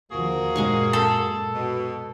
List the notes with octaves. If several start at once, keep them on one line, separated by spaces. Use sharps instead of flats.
D#2 D3 F3 A#3 F#4 G#4
F#2 A#2 G#3 F5 C#6
A4
B2